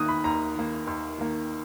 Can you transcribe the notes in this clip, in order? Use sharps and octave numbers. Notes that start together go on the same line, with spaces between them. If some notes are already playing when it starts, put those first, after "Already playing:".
Already playing: D#2 D#3 A#3 D#6 F#6
B5
D#2 A#5
D#3 A#3
D#2
D#3 A#3